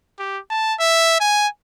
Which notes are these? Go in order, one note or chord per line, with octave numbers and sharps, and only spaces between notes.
G4
A5
E5
G#5